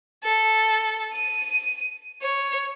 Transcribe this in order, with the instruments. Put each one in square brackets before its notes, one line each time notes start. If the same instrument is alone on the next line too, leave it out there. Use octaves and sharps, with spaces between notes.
[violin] A4
D#7
C#5